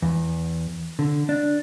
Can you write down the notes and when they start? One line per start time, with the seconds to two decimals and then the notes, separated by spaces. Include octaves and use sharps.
0.02 E2
0.99 D3
1.29 D4